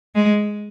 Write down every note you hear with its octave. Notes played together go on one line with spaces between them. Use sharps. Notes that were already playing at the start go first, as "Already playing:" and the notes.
G#3